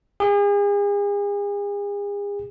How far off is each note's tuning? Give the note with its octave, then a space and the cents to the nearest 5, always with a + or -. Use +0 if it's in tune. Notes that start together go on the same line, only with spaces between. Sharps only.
G#4 -40